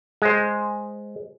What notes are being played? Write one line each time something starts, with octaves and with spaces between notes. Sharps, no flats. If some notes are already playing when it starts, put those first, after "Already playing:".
G#3 C5